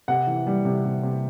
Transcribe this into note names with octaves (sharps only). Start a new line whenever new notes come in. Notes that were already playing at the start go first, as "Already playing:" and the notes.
C3 F#5
E3
G3
C3
C3
C3